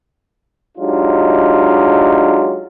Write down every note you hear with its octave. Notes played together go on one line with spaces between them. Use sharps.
F#3 G#3 D4 D#4 F4 G4